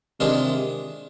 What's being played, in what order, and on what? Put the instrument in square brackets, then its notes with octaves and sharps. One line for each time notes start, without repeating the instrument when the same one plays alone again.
[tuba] C3 [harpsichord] D#3 G#3 D4 F4 G#4